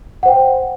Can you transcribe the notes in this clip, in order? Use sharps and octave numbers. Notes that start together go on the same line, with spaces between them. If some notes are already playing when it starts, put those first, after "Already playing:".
C5 F#5 G5